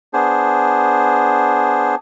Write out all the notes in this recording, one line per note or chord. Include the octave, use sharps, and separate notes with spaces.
B3 D4 G#4 C5